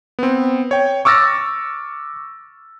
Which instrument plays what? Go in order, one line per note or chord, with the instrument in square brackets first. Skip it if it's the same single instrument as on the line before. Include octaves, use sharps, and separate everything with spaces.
[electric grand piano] B3 C4
C#5 G5
C#6 D6 E6 F6 A6 A#6